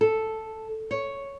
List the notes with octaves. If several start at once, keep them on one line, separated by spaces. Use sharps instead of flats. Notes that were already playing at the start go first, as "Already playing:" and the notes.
A4
C#5